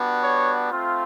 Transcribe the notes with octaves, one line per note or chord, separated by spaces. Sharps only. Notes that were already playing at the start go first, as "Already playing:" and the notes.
Already playing: G3 B3 D4 F#4
C#5
A3 C4 F4